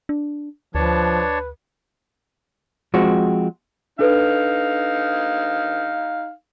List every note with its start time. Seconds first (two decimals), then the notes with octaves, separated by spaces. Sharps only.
0.09 D4
0.75 D2 F3 D4 B4 C#5 A5
2.94 F3 G#3 C4 F#4
3.99 D4 D#4 A4 B4 F5